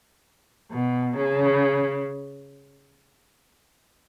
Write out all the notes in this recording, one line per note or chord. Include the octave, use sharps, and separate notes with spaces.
B2
C#3